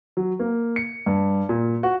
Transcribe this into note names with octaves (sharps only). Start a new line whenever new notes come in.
F#3
A#3
C#7
G2
A#2
F#4